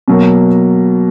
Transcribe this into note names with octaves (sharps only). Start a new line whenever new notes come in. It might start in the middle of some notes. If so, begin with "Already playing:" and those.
B2 F#3 A#3